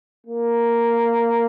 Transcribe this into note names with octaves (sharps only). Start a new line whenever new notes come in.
A#3